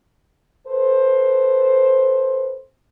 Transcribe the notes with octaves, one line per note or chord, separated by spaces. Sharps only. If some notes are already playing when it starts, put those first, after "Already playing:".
A4 B4 C5